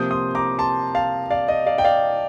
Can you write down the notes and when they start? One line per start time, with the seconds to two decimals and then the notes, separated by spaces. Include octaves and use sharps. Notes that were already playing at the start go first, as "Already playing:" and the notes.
Already playing: C3 F3 A#3 D#6 G6
0.11 C6 D#6
0.35 A#5 D6
0.59 A5 C6
0.95 F5 A5
1.30 D5 F5
1.48 D#5
1.66 D5 F5
1.78 G5
1.84 D5 F5